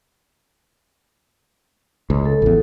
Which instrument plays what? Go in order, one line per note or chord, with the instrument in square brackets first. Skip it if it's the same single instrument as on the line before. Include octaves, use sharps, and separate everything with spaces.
[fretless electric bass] C#2
[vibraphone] A4
[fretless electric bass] A1 E2